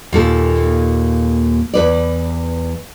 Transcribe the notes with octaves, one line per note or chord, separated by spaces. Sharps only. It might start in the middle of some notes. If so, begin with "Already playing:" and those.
D#2 A#2 A4
E2 B4 D5